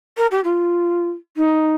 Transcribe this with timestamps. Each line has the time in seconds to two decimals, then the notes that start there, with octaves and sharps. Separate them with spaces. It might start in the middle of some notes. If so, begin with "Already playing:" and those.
0.17 A#4
0.31 G4
0.44 F4
1.37 D#4